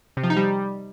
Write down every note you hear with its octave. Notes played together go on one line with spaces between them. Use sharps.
C3
F3
D#4
G3